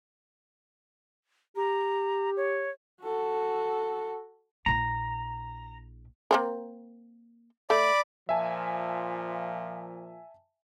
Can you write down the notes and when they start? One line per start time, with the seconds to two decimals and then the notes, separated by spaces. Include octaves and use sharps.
1.57 G4 A#5
2.37 C#5
3.02 F#4 A4
4.66 A#1 E4 A#5
6.31 A#3 C4 A#4
7.70 A3 D5 B5 D6
8.29 A#2 F3 E5 G#5 A5